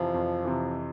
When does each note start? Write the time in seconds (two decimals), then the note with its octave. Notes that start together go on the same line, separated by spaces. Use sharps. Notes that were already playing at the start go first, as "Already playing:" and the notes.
Already playing: F2 C3 E3 F3
0.14 F2
0.44 C3 E3